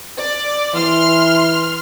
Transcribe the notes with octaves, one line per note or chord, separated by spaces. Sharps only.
D5
E3 C6 F6